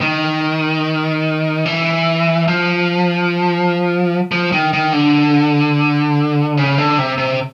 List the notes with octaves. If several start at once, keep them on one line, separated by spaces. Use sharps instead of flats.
D#3
E3
F3
F3
D#3
D#3
D3
C#3
D3
C3
C3